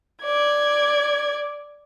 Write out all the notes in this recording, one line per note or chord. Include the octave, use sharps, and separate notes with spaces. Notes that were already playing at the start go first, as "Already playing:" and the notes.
D5 G#6